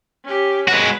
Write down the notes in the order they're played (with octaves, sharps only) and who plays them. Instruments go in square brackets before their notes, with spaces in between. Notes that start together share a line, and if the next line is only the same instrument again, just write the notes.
[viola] C#4 G4
[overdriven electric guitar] G#3 F#4 [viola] B4